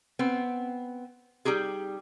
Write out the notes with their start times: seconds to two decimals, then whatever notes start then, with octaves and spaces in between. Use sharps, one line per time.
0.19 B3 C4
1.45 G3 D#4 G4 G#4